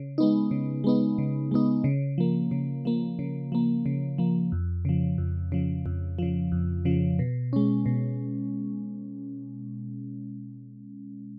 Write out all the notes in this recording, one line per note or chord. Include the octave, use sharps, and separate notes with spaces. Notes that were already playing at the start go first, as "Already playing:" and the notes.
Already playing: C#3
G#3 B3 D#4
C#3
G#3 B3 D#4
C#3
G#3 B3 D#4
C#3
F3 A#3
C#3
F3 A#3
C#3
F3 A#3
C#3
F3 A#3
F2
C#3 F3
F2
C#3 F3
F2
C#3 F3
F2
C#3 F3
B2
G#3 C#4
B2